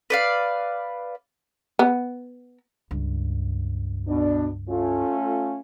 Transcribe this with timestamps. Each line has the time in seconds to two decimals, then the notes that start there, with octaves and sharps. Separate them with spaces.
0.10 B4 D5 F5
1.79 B3
2.91 C#2 G2
4.07 B2 D4
4.69 A3 C#4 F4